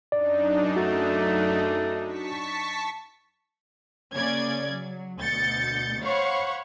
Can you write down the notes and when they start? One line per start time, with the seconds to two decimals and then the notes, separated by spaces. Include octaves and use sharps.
0.12 F#2 D4 D#4 D5
0.76 A3 F#4
2.06 A5 C#6 B6
4.14 C#3 A#3 C#4 D5 G#6
4.70 F#3
5.20 D2 B2 G6 A6 C#7
6.03 C5 C#5 F5 F#5 B5 C#6